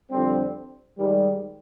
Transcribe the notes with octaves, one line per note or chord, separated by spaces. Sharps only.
F2 D3 G3 C4
G#2 D#3 G3